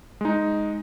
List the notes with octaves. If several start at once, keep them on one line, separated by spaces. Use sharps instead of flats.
G#3 D#4